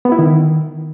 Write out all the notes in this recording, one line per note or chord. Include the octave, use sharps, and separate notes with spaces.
B3
E4
D#3